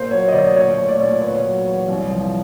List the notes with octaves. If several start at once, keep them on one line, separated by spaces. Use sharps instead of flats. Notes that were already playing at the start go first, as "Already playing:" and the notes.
Already playing: A#2 A#3 C5
F#3 C#5
D#5
D2 D5
A#2 C#5
A3
D5
A#2
B3 C#5
F#3
E2
C2
F3